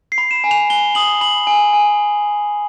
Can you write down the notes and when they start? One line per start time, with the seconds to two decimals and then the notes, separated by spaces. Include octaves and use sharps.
0.12 C7
0.18 B5
0.31 E7
0.44 G#5
0.51 F7
0.70 G#5 G7
0.95 D#6 F#7
1.21 B5 F#7
1.47 G#5
1.73 G#5